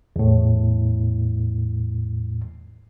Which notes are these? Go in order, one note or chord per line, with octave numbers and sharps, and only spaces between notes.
E2 A2